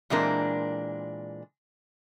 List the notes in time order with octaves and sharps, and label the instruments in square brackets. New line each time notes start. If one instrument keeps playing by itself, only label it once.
[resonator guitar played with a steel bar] A#2 E3 G#3 C4 D4 A#4